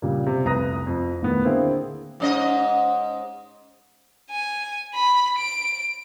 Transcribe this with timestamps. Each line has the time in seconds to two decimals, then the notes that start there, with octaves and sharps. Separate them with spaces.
0.02 A#2 C#3 G3
0.26 C3
0.45 F1 C2 B4 A#5 D#6 A#6
0.87 F2
1.22 D#1 A2 D#3 B3
1.43 D3 A#3 C4 E4 G#4
2.20 G#2 C#4 D#5
4.31 G#5
4.94 B5
5.38 D7